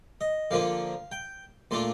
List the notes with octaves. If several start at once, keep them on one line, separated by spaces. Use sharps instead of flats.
D#5
D3 F3 A#3 F4 F5
G5
A#2 A3 D4 F4 C6